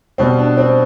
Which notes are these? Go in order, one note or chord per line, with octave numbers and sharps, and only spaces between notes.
B2 G3 C4
D4
C4